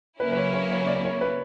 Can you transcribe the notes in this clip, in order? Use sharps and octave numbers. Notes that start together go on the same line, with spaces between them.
C#3 F#3 A#3 C#4 E4 B4
B4
C#5
C#5
C#5
D5
C#5
B4